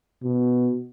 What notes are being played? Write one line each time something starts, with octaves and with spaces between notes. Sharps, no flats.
B2